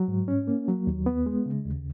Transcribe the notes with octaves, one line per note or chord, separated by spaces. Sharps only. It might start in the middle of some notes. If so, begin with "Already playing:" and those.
Already playing: F#3
G#2
C#4
A#3
F#3
D#2
B3
G#3
C#3
D#2